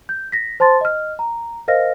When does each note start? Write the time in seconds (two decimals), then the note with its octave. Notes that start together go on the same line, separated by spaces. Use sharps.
0.09 G6
0.32 A#6 B6
0.60 C5 A5 C6 A6
0.81 D#5 F6
1.19 A#5
1.68 A#4 C5 D#5 F5 F6 A#6